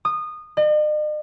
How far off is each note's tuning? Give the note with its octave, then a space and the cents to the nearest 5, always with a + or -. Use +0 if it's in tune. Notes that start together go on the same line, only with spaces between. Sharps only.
D#6 -20
D#5 -45